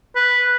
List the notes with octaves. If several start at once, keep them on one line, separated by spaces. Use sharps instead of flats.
B4